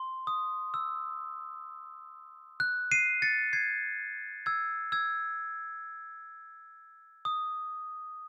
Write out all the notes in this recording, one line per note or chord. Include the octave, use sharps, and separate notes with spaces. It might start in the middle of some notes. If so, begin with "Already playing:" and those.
Already playing: C6
D#6
E6
F#6
C7 D#7
A6 C#7
G#6 C7
E6 G#6
E6 G#6
D#6